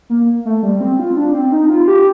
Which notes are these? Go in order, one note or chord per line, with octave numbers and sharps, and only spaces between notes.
A#3
A3
G3
C4
F4
D4
C4
D#4
F4
G4